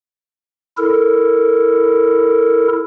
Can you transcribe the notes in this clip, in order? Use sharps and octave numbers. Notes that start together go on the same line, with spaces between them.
E4 A4 A#4